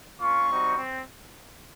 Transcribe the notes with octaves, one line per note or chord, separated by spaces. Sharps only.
A#3 C#4 F4 C#6
G3 C4 D#4 F#4
C4